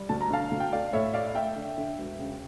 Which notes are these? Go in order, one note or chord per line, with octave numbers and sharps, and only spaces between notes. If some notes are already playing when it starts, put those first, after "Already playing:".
Already playing: G3
D2 A5
A#5
D3 F5 A5
D2
G5
A3 D5 F5
A2 C#5 E5
A3 D5 F5
A3 E5 G5
D3
D3
E1
C#3